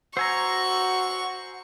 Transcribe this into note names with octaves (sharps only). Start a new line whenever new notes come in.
F#4 C5 G#5 A#5 C#6 E6